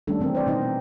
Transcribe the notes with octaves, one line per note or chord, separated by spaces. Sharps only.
D#3 G3 A3 C#4 D4 A4
D#3 E3 C4 D4 A#4
C5 D5
B2 D#3 C4 D#4 C5 D#5
B3